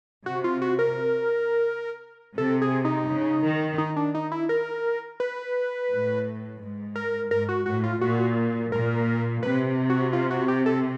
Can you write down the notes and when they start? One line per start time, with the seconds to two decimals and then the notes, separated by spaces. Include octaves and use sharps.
0.26 C3 F#4
0.44 F4
0.62 F#4
0.79 A#4
2.38 C3 A4
2.62 G#4
2.85 D#4
3.08 C#3
3.44 D#3
3.78 D#4
3.96 D4
4.15 D#4
4.32 E4
4.49 A#4
5.20 B4
5.90 A2
6.61 G#2
6.96 A#4
7.31 G#2 A#4
7.49 F#4
7.66 A2 F#4
7.84 F4
8.01 A#2 F#4
8.72 A#2 A#4
9.42 C3 B4
9.90 F#4
10.13 F4
10.31 F#4
10.48 G4
10.66 A4